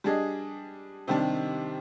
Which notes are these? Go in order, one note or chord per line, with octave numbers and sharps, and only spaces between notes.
G3 D4 G#4 D#5
C3 D#3 G3 D4